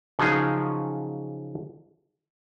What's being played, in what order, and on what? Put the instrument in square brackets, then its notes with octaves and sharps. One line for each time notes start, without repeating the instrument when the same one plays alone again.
[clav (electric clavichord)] C#3 F3 F#3 D#4 G#4